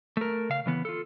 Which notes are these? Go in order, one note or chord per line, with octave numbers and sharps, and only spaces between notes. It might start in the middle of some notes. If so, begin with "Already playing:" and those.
A3 A#4
C#3 F5
C#3 E3 B3
F4 A4